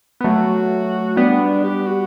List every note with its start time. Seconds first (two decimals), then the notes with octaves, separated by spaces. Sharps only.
0.21 B3
0.24 F#3 A3 F#4
1.16 G3 B3 D4
1.63 G4
1.87 F#4